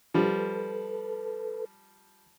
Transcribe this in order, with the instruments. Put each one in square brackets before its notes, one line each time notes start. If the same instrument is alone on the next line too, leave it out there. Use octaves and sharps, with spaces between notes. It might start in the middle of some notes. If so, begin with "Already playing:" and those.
[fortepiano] F3 G3 [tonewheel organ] A4 B4